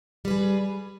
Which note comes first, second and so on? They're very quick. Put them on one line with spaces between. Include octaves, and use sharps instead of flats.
G3 B4 G#4